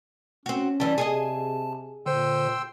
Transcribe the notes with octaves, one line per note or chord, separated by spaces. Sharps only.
C4 C#4 F#4
G2 E3 G3 A5
C3 G#4 A4 D#5
A#2 D3 C5 G5 C6 E6